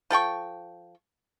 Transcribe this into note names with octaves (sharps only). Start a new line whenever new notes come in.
F3 A4 G5 C#6